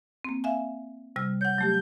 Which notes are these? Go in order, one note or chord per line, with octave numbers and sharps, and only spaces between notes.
A#3 C4
E5 F5 G#5
C3 G3 F6
C#5 F#5 G6
F#3 A3 G4